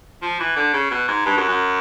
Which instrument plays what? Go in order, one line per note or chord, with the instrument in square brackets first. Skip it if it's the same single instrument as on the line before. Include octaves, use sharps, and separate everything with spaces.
[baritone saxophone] F3
E3
D3
C#3
B2
G#2
G2
F#2
F#2